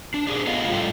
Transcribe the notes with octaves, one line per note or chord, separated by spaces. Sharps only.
D4
D4 G4 G#4 D5
A3 B3 F4 D#5 F5
A2 F#3 G3 F4 A4 G5